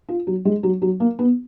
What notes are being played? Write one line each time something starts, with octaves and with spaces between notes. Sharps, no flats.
F4
F#3
G#3
F#3
F#3
A#3
B3